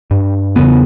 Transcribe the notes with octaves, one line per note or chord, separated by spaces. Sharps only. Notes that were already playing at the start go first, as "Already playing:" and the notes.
G2
E2 C#3 B3